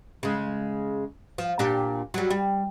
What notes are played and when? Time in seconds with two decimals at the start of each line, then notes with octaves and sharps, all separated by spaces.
0.23 C#3 G#3
1.38 F3
1.59 A#2 D4 G4
2.14 F#3 G3
2.31 G3